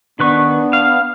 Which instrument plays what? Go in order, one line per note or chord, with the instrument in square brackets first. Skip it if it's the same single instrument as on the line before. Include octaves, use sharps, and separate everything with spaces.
[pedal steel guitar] D#3 B4 C#6 [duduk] B3 [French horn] D4
[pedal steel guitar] F5